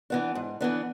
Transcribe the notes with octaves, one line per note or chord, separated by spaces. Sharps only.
E3 B3 D4
G#2
E3 B3 D4